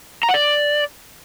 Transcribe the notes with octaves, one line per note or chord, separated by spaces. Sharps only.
A#5
F#5
D5